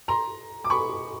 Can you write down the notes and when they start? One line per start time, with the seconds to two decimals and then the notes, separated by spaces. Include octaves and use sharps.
0.08 A#5 C6
0.64 D6
0.70 B5 C#6